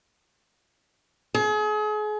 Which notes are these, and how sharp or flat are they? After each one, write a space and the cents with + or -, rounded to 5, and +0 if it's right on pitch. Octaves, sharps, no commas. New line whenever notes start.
G#4 +35